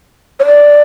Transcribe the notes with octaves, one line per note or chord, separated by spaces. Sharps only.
C#5
D5